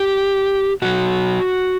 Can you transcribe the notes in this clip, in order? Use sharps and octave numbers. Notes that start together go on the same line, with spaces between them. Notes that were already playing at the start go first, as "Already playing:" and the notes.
Already playing: G4
B2 F#3 F#4